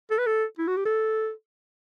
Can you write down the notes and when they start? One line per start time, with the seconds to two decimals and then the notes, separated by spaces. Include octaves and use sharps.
0.11 A4
0.18 B4
0.26 A4
0.59 E4
0.67 F#4
0.76 G4
0.85 A4